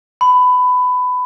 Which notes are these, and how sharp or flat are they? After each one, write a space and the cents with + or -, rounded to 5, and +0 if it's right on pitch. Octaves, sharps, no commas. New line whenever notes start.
B5 +20